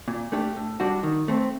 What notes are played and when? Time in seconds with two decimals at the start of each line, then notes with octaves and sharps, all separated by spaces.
0.08 A#2
0.32 A3 D4 G4
0.56 A2
0.80 G3 D4 F#4
1.03 D#3
1.28 A3 C4